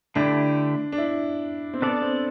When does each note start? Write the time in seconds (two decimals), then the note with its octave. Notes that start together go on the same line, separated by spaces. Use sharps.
0.15 D3 A3 D4 E4 G4
0.92 D4
0.98 E4
1.74 C4
1.82 B3 D4 A4 D5
2.02 C4